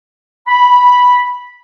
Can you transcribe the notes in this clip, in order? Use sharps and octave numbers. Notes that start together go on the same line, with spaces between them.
B5